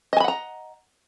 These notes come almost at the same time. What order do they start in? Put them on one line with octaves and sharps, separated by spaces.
D#5 G#5 B5 F#5 A#5